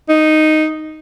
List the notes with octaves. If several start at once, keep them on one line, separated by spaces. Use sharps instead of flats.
D#4